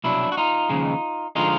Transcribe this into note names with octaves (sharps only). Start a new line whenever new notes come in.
C2 B2 F#3 D4 E4
F#4
D#4 F4
D#2 C#3 F3 G#3
D3 F3 G#3 D#4 F4